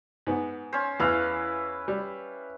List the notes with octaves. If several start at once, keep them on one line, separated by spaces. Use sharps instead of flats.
G#2 B3
C#4 C5
E2 E4 B4 F5
G3